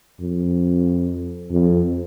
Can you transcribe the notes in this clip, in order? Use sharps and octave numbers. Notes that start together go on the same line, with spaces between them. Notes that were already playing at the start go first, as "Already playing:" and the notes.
F2
F2